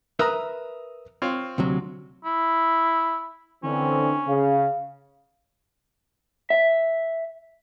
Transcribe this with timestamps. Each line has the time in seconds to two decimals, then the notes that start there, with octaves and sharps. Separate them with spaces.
0.19 A#4 B4 E5 A#5 D#6 E6
1.22 C4 F4 C#5
1.58 D2 C3 F#3
2.25 E4
3.63 D3 E3 C4 C#4
4.28 C#3 F5
6.50 E5